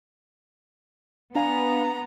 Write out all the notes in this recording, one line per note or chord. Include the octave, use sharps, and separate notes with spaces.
B3 D4 F5 G#5 A#5